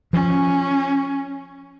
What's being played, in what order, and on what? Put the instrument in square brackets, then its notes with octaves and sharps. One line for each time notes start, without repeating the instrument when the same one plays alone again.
[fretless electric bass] F3 [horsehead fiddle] C#4